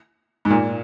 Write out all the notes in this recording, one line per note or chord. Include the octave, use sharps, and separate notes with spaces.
G#2
A#2